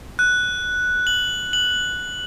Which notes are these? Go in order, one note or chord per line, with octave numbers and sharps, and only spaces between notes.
F#6
F#7
F#7